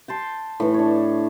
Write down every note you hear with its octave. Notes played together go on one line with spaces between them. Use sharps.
G5 A5 C6
A2 E3
D4 C#5